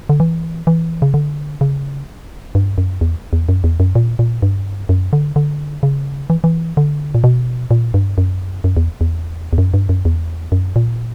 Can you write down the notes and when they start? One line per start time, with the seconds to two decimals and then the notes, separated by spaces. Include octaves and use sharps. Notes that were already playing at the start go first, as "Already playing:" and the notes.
0.09 D3
0.20 E3
0.67 E3
1.02 C#3
1.14 D3
1.61 C#3
2.55 G2
2.78 F#2
3.01 E2
3.33 E2
3.49 F#2
3.64 E2
3.80 F#2
3.95 A#2
4.19 A#2
4.42 G2
4.89 F#2
5.13 D3
5.36 D3
5.83 C#3
6.30 E3
6.44 E3
6.77 D3
7.15 A#2
7.24 B2
7.71 A#2
7.94 G2
8.18 F#2
8.64 F#2
8.77 E2
9.01 E2
9.53 E2
9.58 F#2
9.74 G2
9.89 F#2
10.05 E2
10.52 F#2
10.76 A#2